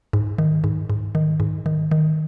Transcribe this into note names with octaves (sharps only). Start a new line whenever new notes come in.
G#2
D#3
G#2
G#2
D#3
G#2
D#3
D#3